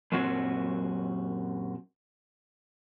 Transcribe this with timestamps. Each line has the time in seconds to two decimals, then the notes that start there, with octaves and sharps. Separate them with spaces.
0.12 F#2 A#2 F#3 C4 F#4